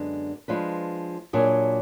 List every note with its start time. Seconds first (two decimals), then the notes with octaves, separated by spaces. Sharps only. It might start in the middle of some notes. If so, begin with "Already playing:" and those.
Already playing: F#2 D3 G#3 B3 D4
0.48 F3 G#3 D4 F4 B4
1.33 A#2 F#3 D4 G#4